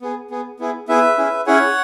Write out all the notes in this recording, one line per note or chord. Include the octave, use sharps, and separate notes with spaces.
B3 G#4
B3 G#4
B3 E4 G#4
B3 E4 G#4 B4 E5
C#4 E4 G#4
C#4 E4 G#4 C#5 F#5